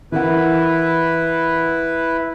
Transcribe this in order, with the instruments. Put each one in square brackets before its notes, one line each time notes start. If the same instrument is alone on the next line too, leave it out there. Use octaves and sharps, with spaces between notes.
[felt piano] E3 A#4 F#5 [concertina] E4 B4